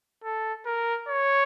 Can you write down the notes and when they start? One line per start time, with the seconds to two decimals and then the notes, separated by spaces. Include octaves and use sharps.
0.24 A4
0.66 A#4
1.08 C#5